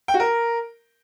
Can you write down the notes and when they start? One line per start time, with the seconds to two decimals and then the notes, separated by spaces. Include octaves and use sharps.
0.08 G5
0.14 F#4
0.20 A#4